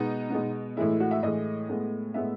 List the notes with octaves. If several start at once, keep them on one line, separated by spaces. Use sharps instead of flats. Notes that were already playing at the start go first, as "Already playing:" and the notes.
Already playing: B2 G#3 B3 D#4
B2 G#3 B3
A2 E3 G#3 E4
F#4
E5
A2 E3 G#3 D#5
A2 G#3 B3
A2 G#3 B3 E5